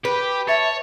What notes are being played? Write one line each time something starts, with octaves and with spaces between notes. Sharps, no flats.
G4 B4
C#5 E5 A5